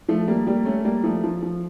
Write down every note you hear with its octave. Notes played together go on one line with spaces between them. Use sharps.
F3 A3
G3 A#3
G3 A#3
A3 C#4
G3 A#3
F3 A3
F3
F3